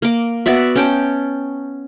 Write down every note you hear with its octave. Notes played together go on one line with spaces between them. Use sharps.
A#3 D6
B3 F#4 D5 E5
C#4 G5 A5